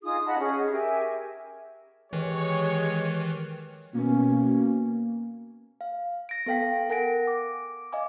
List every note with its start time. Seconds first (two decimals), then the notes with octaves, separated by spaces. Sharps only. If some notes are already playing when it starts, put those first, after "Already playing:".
0.03 D#4 F4 G#4 D#6
0.25 D#5 F#5 A5 B5
0.39 C#4 G#4
0.71 G4 A#4 E5 G#5
2.13 D#3 E3 G#3 G4 C#5
3.94 B2 A#3 C#4
5.81 F5
6.29 A#6 D7
6.46 B3 A4 F5 G5 B6
6.89 A#4 F#5 G#5 A#6 D7
7.27 D6
7.93 D#5 F5 G#5 D6